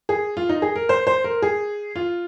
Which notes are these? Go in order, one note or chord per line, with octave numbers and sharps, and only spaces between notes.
G#4
F4
D#4
G#4
A#4
C5
C5
A#4
G#4
F4